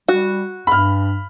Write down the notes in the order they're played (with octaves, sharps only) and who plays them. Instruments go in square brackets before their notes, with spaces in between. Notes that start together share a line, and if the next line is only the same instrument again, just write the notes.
[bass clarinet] G3 [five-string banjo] F#4
[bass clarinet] G2 [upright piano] B5 F6